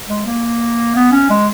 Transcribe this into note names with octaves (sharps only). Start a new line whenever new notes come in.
G#3
A#3
B3
C#4
G#3